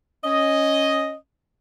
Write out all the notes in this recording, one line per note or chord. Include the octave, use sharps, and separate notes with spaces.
C#4 D#5